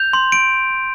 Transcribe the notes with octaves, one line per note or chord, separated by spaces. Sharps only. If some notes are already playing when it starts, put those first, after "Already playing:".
Already playing: G6 F7
C6
D7